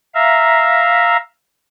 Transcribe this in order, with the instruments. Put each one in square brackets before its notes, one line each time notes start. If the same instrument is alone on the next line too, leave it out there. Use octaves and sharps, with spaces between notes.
[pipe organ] E5 F5 A#5